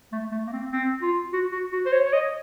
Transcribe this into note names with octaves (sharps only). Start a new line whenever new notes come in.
A3
A3
A#3
C4
C4
F4
F#4
F#4
F#4
C5
C#5
C#5
D#5